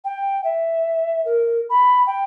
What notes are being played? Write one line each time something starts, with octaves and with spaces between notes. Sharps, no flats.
G5
E5
A#4
B5
G5